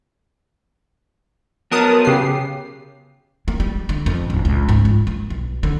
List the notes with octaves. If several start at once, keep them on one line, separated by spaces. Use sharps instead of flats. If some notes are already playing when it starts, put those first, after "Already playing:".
F#3 B3 A#4 A5 D#6
C#3 G4 C7
A#3
G3
D3
F2
D1
C#2
G#2
F4
A#3
B1
D3